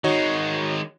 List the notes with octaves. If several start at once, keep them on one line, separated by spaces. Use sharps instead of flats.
D#3 G#3 D#4 F#4 C#5